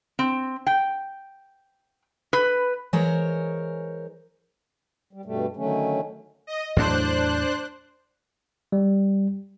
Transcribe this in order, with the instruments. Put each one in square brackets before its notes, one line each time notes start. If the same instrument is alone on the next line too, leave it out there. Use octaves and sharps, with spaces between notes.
[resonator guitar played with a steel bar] C4
G5
B4
[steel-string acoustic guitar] E3 G#3 A#4 C5 C#5
[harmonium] G3
G2 B2 G3 A3
D3 D#3 F#3 A3 C#4
[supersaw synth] D#5
[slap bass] E2 A2 F#3 [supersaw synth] D4 C5 F#6
[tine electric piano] G3